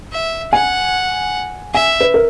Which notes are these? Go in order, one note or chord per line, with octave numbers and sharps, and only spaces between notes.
E5
F#5 G#5
E5 G#5
B4
A#4